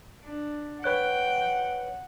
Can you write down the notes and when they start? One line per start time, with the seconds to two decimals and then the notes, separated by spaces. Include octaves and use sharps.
0.24 D4
0.84 B4 C#5 F#5 G5 F#6